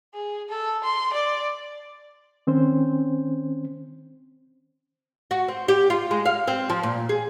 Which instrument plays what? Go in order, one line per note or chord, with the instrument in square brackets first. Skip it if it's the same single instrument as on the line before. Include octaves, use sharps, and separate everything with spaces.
[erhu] G#4
A4
C6
D5
[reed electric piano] D#3 C4 C#4 C5
[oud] F#4
C4
G4
F4
G#3
F5
C4
F3
A#2
G#4